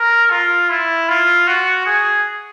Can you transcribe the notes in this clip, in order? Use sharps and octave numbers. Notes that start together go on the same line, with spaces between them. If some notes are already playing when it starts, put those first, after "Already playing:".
Already playing: A#4
F4
E4
F4
F#4
G#4